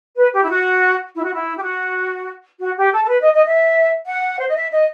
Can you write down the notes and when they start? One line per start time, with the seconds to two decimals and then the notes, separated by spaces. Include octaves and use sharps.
0.16 B4
0.34 G4
0.44 E4
0.50 F#4
1.15 E4
1.24 F#4
1.34 E4
1.58 G4
1.63 F#4
2.60 F#4
2.78 G4
2.94 A4
3.04 A4
3.09 B4
3.21 D#5
3.33 D#5
3.46 E5
4.07 F#5
4.39 C5
4.47 D#5
4.56 E5
4.72 D#5